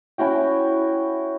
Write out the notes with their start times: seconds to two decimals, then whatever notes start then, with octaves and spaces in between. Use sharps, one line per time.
0.18 C#4 E4 F#4 G5